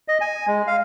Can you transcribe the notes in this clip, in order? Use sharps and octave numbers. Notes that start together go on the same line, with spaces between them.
D#5
G#5
G#3
F5